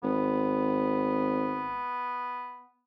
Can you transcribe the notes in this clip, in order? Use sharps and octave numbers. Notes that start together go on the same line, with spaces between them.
G#1 B3